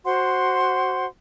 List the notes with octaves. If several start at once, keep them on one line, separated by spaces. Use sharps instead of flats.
F#4 C5 F#5 C6